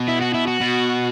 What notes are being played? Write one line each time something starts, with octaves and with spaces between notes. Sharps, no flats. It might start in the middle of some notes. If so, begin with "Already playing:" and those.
Already playing: B2
E4
F#4
E4
F#4
B2